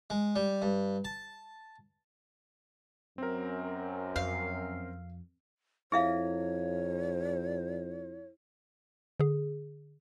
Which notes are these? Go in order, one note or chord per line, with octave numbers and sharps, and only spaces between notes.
G#3
G3
G2
A5
F#2 C4 A#4
F2 F5
F2 E4 G#4 C#5 E5 F5
D3 G#4